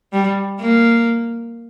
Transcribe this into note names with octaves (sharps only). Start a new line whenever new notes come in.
G3
A#3